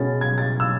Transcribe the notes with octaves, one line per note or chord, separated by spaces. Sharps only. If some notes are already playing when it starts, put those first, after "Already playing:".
Already playing: B2 G#3 C#4 A6
G#6
A6
E6